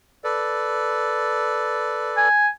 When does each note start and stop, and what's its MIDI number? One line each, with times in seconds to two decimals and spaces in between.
0.24 2.28 69
0.24 2.28 71
0.24 2.28 74
2.17 2.47 80